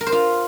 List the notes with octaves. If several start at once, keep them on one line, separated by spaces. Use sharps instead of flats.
A#4
C5
F4